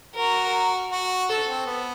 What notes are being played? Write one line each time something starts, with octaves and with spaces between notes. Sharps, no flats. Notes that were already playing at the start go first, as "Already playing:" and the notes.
F#4 A#4
F#4
A4
C4
B3